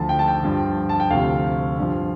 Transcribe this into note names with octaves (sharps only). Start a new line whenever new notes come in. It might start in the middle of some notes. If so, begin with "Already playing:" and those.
Already playing: D2 D3 F3 A5
G5
A5
G5
G2 F3
A5
G5
D2 C3 F3 F5
G2 F3